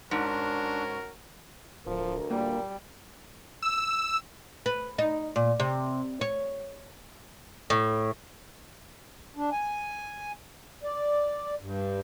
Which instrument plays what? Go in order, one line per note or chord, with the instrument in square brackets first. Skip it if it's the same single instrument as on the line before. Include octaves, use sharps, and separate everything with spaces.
[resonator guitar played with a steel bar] G#2 [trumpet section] C#4 F#4 A#4 [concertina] D4
[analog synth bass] D1 [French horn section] D2 A#4 [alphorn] F3
[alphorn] A#2 [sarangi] G3 [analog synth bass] A#3
[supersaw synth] E6
[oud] B4
D#4
A#2
C3
C#5
[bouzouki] A2
[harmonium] D4
G#5
D5
G2